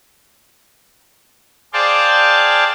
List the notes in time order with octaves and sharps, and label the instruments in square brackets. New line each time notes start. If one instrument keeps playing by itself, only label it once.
[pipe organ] G#4 C5 D5 F5 G5 A5